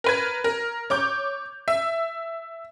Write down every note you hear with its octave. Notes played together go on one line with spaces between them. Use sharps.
A#4 B4 G#6
A#4
C#5 D6 G6
E5